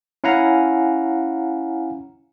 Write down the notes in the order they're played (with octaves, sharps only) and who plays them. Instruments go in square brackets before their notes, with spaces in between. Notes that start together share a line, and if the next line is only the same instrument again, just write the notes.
[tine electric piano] C#4 E4 F5 F#5 G#5 A#5